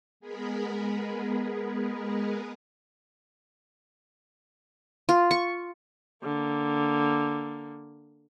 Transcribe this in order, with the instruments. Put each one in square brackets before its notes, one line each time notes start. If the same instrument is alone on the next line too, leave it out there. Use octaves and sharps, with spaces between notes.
[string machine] G#3 B3 G#4 A#4 B4
[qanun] F4
C#6
[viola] D3 A#3